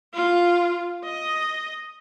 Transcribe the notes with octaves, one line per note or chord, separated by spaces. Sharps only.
F4
D#5